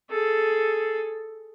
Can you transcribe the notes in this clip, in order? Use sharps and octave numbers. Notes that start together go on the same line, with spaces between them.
G#4 A4